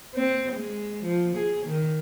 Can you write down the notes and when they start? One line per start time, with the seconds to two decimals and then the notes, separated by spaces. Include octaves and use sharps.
0.15 C4
0.52 G#3
1.03 F3
1.36 G#4
1.66 D#3